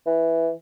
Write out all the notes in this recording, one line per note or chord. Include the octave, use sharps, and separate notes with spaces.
E3